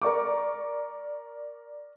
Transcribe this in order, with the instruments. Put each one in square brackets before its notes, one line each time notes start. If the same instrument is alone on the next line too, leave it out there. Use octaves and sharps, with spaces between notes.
[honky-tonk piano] A#4 D5 C#6 D6